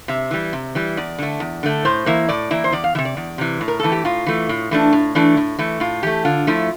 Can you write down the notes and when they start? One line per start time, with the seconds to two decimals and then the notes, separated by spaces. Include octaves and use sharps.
0.08 C3 E5
0.31 E3 G3
0.53 C3
0.75 E3 G3
0.97 E2 D5
1.18 D3 A3
1.40 E2
1.63 D3 A3
1.85 A2 C5
2.06 E3 A#3 E4
2.28 A2 D5
2.51 E3 A#3 E4
2.64 C5
2.72 E2 D5
2.84 F5
2.95 C3 E3 E5
3.05 D5
3.17 E2
3.38 C3 E3
3.61 A2
3.68 A#4
3.80 E3 A3 A4
3.92 G4
4.05 A2 F4
4.26 E3 A3
4.49 A2
4.71 E3 A3 D4
4.93 A2
5.15 E3 A3 D4
5.37 A2
5.59 E3 A3
5.80 A2 F4
6.03 E3 A3 G4
6.25 D3 F4
6.47 F3 A3 E4